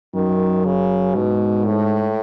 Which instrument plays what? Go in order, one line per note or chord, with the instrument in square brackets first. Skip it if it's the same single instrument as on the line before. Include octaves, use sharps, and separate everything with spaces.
[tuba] F#2 [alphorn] D#3
[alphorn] C#3
[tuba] G#2 [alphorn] B2
[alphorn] A2